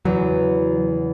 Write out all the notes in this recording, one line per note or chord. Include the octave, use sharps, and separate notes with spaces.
E2 C#3 F#3